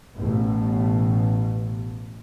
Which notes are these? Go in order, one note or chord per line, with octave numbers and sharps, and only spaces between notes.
A1 B2